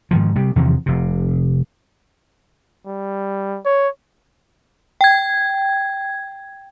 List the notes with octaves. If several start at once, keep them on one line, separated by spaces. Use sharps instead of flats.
G#2 D#3 F3
C3 G3
E2 C3 D#3 F3
F1 C3
G3
C#5
G5 G#6